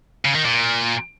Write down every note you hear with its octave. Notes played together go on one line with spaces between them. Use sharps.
C#3
D#3
A#2